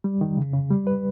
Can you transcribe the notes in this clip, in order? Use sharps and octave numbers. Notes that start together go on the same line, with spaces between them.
G3
D#3
C#3
C#3
G3
B4